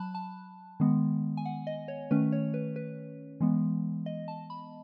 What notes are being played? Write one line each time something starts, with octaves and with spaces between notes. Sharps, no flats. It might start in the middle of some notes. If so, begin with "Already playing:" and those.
Already playing: F#3 A5 B5 F#6
A5
D#3 G#3 B3
G#5
F#5
D#5
C#5
D#3 A3 C#4 B4
C#5
B4
B4
E3 G#3 B3
D#5
A5
B5